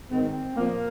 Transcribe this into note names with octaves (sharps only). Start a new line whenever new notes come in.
G#2 D#3 C4
A#2 F3 A#3